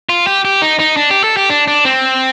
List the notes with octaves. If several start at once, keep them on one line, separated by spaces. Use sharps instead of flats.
F4
G4
G4
D#4
D#4
D4
G4
A4
G4
D4
D4
C4